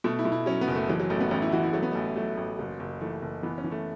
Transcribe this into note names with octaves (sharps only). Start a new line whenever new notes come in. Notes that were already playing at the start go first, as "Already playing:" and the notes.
B2 A3
E4
B2
E4
F#3 C#4
B3
F#1
A3
E3 F#3
F#3
A1 A3
B3
A1 C#4
E4
E3 F#4
E4
F#3 A3
B3
A1 A3
F#3 A3
A1 A3
F#1 F#3
F#1
E3 A3
F#1
E3 B3
C#4
E3
A3